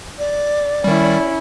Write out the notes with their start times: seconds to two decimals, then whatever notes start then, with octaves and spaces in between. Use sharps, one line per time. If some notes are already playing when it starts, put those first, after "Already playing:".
0.19 D5
0.84 D#3 G3 C#4 E4